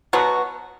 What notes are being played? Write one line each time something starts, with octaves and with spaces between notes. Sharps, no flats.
B2 F#3 B3 F#4